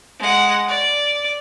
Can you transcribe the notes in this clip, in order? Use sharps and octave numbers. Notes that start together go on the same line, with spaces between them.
G#3 F#5
D5